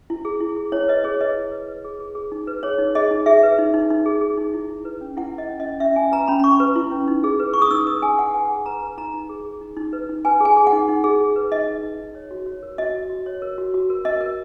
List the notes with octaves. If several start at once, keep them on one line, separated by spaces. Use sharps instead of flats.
E4
G#4
E4
G#4
E4 C#5
B4 D#5
G#4 C#5
B4 D#5
E4
B4
B4
G#4
G#4
G#4
D#4
B4
G#4 C#5
D#4
G#4 D#5
D#4
G#4 E5
B4
D#4
D#4
D#4
G#4
G#4
D#4
E4
E4
B4
C#4
E4 F#5
E4
D#5
C#4
D#5
C#4
C#4 E5
C#4 G#5
B4 A#5
C#4 B5
B5
C#4 C#6
B4
E4
C#4
D#4
G#4
B4
G#4 C#6
D#6
D#4 E6
B4 D#6
G#4 G#5
D#4 F#5
B4 G#5
G#4
B4 A#5
B4
D#4 A#5
D#4
G#4
G#4
D#4
D#4
B4
D#4
B4 G#5
G#4 G#5
G#4
F#5
D#4
D#4
G#4
G#4
B4
D#4 D#5
D#4
D#4
D#4
C#5
F#4
C#5
A#4
F#4 D#5
F#4
F#4
C#5
A#4
F#4
F#4
A#4
A#4 D#5
A#4